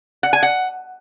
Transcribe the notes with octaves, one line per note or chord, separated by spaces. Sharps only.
F#5
G#5
F#5